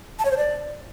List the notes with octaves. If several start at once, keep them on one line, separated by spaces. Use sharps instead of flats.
A5
C#5
C5
D5